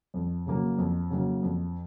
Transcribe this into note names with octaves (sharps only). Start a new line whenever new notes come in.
F2
C#3 F#3 A#3
F2
C#3 F#3 A#3
F2